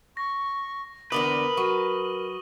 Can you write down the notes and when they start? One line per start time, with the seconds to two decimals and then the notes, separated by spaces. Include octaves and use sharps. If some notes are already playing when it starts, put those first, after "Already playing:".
0.17 C#6 A#6
1.12 E2 D3 A#4 B4 D5 D#6 F#7 G7
1.57 F#3 C#6 D#7